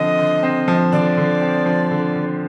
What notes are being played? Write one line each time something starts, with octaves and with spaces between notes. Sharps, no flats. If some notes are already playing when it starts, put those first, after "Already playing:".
Already playing: D3 F3 C4 D#5
D3
C4
F3
D3 D5
D3
C4
F3
D3
D3